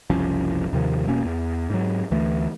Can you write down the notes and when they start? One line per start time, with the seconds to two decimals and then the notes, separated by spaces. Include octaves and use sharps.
0.10 F#1 C2 F3 C#4
0.73 D#2 C3 D#3 F3
1.08 E1 B2 A#3 C#4
1.25 E2
1.70 G#2 F#3
2.11 D2 E3 A3